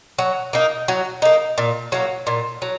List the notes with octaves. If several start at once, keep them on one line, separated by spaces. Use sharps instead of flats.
F#3
A#3 D#4
F#3
A#3 D#4
A#2
F#3 A#3
A#2
F#3